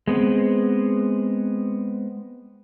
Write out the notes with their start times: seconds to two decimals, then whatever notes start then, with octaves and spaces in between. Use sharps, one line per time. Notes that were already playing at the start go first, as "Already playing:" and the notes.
0.07 G#3 B3 C4